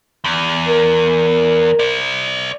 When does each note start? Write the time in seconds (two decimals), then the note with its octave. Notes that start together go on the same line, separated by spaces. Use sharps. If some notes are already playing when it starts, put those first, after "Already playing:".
0.24 E2
0.68 A#4
1.79 C5 D5